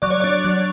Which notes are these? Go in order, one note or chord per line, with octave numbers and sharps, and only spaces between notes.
F#3 D5
C#5
D4 D5
F#3